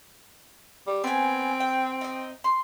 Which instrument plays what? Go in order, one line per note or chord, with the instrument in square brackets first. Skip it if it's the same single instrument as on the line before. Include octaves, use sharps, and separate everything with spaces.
[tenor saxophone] G3
[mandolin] B3 G#5 [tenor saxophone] C4
[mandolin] G5
D#4 D#5
C6